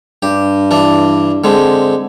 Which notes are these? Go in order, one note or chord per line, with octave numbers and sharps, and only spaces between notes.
G2 G4
E3 D4
D3 G#3 C4